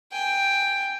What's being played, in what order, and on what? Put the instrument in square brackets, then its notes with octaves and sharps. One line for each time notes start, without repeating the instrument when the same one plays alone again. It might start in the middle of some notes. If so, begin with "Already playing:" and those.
[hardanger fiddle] G5 G#5